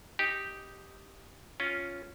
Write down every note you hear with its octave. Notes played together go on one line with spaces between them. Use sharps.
D#4 G4
C#4 F4